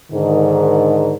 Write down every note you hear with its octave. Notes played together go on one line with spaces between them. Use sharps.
G#2 D3 D#3